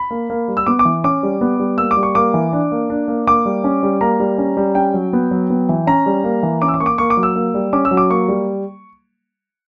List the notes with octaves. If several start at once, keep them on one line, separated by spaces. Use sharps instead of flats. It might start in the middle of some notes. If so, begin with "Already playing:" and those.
Already playing: B5
A#3
A#3
G3
E6
B3 D6
D6
E3
C#4 D6
G3
B3
G3
A#3 E6
D6
G3
C#6
A#3 D6
E3
D4
A#3
D4
A#3
A#3 D6
G3
C#4
G3
A#3 A#5
G3
C#4
G3
C#4 G5
F#3
B3
F#3
B3
E3
C#4 A#5
G3
A#3
E3
C#4 D6
E6
D6
A#3 C#6
D6
A#3 C#6
D6
F#3
E6
A#3
G3
C#4 D6
E6
F#3
D6
A#3 C#6
G3